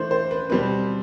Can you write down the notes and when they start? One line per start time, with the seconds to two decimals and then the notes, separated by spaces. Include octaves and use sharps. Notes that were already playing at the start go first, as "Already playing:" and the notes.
Already playing: E3 A3 D4 C5
0.11 C5
0.31 B4
0.50 B2 G3 C4 B4